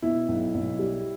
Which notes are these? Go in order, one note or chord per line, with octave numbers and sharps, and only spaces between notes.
B2 E4
B1
B1
G3